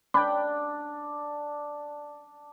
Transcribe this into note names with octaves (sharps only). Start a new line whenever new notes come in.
D4 G5 B5